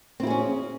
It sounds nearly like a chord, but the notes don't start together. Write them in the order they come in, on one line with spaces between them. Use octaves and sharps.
C4 E4 G#4 C#4